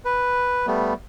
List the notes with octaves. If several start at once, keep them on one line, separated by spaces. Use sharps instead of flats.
B4
G3 A3 B3